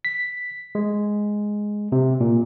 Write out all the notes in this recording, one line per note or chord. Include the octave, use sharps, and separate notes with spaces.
B6
G#3
C3
A#2